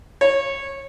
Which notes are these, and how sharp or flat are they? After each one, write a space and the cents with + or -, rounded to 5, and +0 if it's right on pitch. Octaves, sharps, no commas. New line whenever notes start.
C#5 -20